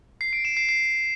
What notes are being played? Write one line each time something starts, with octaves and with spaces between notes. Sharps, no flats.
C7
D7
E7
C7
C7